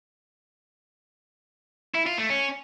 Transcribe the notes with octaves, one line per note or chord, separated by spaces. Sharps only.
E4
F4
A3
C#4